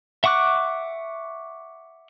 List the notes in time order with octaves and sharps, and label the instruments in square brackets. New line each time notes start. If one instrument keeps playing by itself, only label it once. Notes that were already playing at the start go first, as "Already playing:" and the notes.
[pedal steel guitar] E5 F#5 C#6 D6 F#6